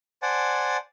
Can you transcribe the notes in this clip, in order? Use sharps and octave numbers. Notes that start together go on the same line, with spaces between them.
C5 D5 F#5 G#5 A5